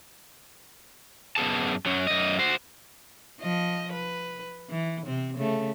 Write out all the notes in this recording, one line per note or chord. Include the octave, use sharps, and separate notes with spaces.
F#2 B3 G#4 A5
F#2 F#3
F#2 D#5
F#4 C5
F3 D#5
B4
E3
C3 C4
C#3 A3